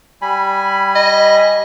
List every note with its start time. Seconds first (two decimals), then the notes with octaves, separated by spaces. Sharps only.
0.22 G3 G#5 B5
0.95 D#5